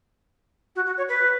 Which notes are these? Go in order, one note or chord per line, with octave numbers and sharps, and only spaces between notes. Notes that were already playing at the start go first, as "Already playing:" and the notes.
F#4
F#4
C#5
B4